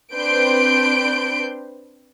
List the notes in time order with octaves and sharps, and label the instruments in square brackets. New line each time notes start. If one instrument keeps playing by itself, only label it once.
[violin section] C4 D4 B4 C6 G6 D7